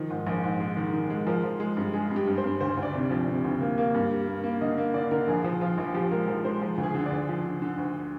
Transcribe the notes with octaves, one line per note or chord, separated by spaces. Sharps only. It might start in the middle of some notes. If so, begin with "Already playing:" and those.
Already playing: D#3 F3
G#2
A#1
G#2
G#3
D#3
D#3
G#3
F3 A#4
F3
G#3
G2
G#3 G#4
G2
G4
G2
C5
G2
D2 C5
D2
D5
C3
D5
F3
C3
D2
A#3
A#3
G2
G3
A#3
A#3
D3 D#5
A#3
D3 D5
D3 A#4
A#1 G#4
F3
F3 F4
A#1
F3 G4
G#3 A#4
F3
G#3 C5
F3
D2
G#4
D3
D5
D2
F3
D3
D3
D2